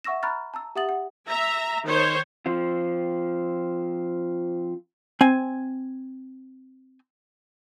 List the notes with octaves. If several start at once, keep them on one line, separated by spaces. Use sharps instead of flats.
E5 F#5 C#6 E6 A#6 E7
A#5 B5 C#6 F6 F#6 A6
A5 A#5 E6
G4 E5 F#5 D#6 A6 F#7
F#5
E5 A#5
D#3 C5 C#5
F3 C4 F4
C4 G#5